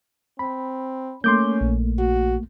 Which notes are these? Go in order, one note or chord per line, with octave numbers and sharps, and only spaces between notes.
C4 B5
A3 A#3 C#4 C6 D6 G6
A#1
F#4